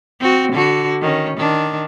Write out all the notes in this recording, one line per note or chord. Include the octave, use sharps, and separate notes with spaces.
C4 F#4
D3 F#4
D#3 C#4
D#3 D4